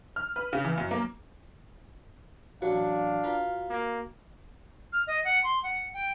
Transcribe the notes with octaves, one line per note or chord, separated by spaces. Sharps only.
F6
B4
C#3
E3
F#2
A#3
A1 F#3 D4 F#4 F5
F4 B4 A#5
A#3
F6
D#5
F#5
C6
F#5
G5